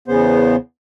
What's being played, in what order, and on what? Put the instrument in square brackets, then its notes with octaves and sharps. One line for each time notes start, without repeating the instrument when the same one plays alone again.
[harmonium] E2 C#3 B3 C5